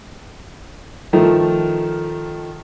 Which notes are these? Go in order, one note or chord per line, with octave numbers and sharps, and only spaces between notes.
D#3 F3 A3